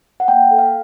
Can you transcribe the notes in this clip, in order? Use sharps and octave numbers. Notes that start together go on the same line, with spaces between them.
F#5
A#3 G5
A4
F5